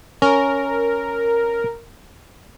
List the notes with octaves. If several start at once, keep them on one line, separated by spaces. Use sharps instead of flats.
C#4 A#4